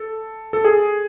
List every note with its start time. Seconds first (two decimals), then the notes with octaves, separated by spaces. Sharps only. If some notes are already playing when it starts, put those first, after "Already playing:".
Already playing: A4
0.53 A4
0.65 G#4